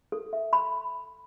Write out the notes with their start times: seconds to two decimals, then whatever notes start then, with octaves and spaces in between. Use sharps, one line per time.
0.12 A4
0.33 E5
0.53 B5